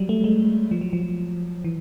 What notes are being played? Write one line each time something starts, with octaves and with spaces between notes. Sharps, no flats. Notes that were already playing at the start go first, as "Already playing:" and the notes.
Already playing: F#3 G3
A3
G#3
F3
F#3
F3
E3